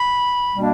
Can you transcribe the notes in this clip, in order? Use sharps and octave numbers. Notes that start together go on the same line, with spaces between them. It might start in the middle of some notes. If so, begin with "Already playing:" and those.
Already playing: B5
B2 G3 A#3 D4